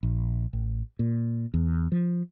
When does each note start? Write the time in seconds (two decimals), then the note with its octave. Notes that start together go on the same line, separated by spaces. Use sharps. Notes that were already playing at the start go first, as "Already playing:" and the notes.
0.03 A#1
0.53 A1
0.99 A#2
1.54 E2
1.92 F3